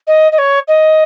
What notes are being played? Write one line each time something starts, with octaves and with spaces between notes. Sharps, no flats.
D#5
D#5
C#5
D#5